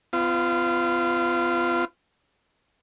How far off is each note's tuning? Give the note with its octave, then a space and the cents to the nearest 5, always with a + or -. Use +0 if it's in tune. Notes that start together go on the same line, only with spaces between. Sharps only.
B3 +40 F4 -15